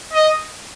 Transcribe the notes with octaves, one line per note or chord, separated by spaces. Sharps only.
D#5